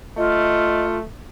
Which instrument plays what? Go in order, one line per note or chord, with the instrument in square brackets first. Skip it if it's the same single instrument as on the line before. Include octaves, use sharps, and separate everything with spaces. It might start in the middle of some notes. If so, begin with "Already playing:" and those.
[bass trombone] A3 [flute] F4 [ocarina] D#5